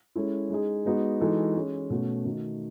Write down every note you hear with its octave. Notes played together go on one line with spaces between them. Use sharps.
G#3 C#4 E4 A4
G#3 D#4 G#4
G#3 B3 D#4 F#4
E3 G#3 D#4 F#4 A4
G#3 C#4 G#4
B2 A3 C#4 F#4
D#3 A3 D#4 F#4